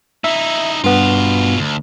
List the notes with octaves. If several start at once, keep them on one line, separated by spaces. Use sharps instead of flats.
D#4 E4 E5
G2 B2 B3 F4
D2